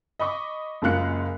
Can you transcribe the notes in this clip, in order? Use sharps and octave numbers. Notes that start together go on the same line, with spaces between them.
D#5 B5 C#6 D6
F#1 G#3 A#3 F4 F#6 C#7